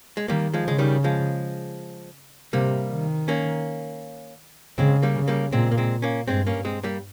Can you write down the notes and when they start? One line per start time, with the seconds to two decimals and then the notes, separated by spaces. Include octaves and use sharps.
0.17 G#3
0.28 D#3 G3 A#3
0.54 F3 G#3
0.66 C#3 G#3
0.78 D#3 G3
1.04 F3 G#3
2.53 C3 G3 A#3
2.91 D#3
3.28 A#3 C#4
4.78 C#3 G#3 C4
5.03 G3 A#3
5.16 C#3
5.28 G3 A#3
5.52 A#2 G#3 C4
5.72 A#3
5.78 G#3 C4
6.02 A#3 C#4
6.28 G2 G#3 C4
6.47 A#3 C#4
6.65 G#3 C4
6.83 G3 A#3